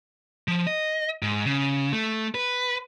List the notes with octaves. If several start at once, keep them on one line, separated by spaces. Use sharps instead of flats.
F3
D#5
G#2
C#3
A3
B4